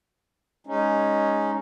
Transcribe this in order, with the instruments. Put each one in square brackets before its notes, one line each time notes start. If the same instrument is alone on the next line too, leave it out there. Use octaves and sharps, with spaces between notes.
[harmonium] G#3 C#4 D#4